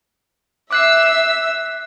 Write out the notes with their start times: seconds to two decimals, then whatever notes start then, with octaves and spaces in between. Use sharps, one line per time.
0.71 E5 D6 E6 F#6 C7